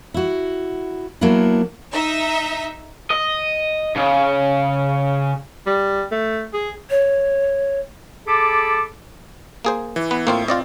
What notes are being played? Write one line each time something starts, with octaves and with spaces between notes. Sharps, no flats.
E4 F#4
F#3 A#3 B3 D4 E4
D#4 E5
D#5
C#3
G3
A3
G#4
C#5
G#4 A4 A5 B5 D6
A#3 G#4 C5
E3
B3 B4
A2 A#3 C4 F4
C4 F4 D5 D#5